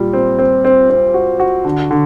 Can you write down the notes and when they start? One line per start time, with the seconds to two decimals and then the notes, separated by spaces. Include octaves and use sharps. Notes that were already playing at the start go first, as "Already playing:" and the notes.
Already playing: A#2 G3
0.13 C4
0.39 C4
0.65 C4
0.90 C4
1.14 F#4
1.40 F#4
1.65 D3
1.91 D3